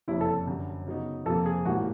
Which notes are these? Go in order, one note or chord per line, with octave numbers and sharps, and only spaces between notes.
F#1 F2 C3 E4
A4
F#2 D3 G3
C#3 F#3 B3 D#4
F2 C3 F3 A#3 A4
G#4
A1 G#2 E3 G3 A#3 F#4